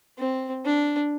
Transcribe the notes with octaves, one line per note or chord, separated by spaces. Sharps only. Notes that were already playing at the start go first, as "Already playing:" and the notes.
C4
D4